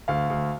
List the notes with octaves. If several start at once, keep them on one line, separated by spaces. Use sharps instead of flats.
D2 F5
D2